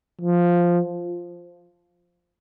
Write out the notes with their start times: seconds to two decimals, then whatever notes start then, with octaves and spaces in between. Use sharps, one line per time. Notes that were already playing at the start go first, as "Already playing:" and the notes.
0.21 F3